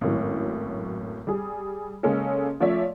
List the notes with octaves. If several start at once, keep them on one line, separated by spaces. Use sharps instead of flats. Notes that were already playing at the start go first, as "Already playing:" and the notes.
G#1 F#2 A2 F#3
G3 G#4
C#3 G#3 A#3 C#4 G#4 A4
F3 A3 C#4 C#5 D5 E5